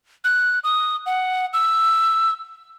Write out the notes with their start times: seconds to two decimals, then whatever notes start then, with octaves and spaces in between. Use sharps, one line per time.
0.24 F#6
0.64 D#6
1.06 F#5
1.53 E6